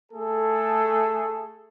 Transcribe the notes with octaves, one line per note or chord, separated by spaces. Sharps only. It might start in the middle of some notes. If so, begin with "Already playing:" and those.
A3 G#4 A4